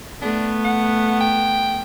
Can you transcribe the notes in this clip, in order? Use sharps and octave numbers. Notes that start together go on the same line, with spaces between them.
A3 B3 D4
F#5
G5